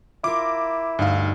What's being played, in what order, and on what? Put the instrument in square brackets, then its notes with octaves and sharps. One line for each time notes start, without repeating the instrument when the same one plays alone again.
[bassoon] E4 [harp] F4 A#4 [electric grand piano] D6
[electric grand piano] D2 F5 [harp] G2 D#4 E6